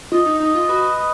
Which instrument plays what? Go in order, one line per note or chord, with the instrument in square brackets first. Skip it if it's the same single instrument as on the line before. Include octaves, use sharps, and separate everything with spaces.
[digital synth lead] F4 [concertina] D#5
[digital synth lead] D#4
[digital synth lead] D#4 [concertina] D#5
[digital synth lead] F4
[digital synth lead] F#4 [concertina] B4
[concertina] D#5